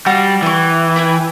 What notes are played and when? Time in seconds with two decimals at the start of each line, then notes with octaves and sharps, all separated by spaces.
0.06 G3 F#4 F5
0.42 E3 G5 C#6
0.96 E4 G5 G#5